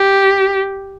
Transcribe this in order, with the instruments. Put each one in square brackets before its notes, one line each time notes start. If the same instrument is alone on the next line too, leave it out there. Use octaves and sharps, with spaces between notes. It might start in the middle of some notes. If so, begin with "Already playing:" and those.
Already playing: [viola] G4